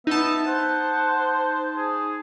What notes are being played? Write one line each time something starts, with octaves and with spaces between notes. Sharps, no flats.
B3 D#4 E5 A5
C5 F#5
G#4